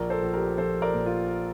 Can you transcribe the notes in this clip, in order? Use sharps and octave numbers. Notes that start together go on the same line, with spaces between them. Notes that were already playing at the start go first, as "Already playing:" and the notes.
Already playing: A#1 A#4 D5
A4 C5
A#1
G4 A#4
F3 A4 C5
A#4 D5
A#2
F4